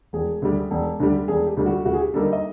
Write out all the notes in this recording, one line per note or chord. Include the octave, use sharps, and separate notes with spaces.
E1 G#4
D2 D3 G3
E1
D2 D3 G3
E1 G#4
G4
D2 D3 G3
F#4
D2 F#4
G#4
G4
D3 G3 A#3 D#4 A4
D#5